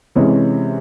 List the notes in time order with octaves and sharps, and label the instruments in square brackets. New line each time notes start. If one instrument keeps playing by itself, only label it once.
[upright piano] C3 E3 G#3 C#4